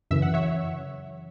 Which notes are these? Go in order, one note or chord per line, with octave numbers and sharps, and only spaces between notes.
F#2 C#3 E3 E5
F#5
C#5 E5